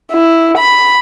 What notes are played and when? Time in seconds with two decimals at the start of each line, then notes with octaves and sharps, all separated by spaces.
0.12 E4
0.58 B5